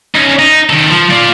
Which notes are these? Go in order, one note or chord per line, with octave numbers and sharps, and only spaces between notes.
C#4 D#4
D#4
D#3 A4
F3
F4 D5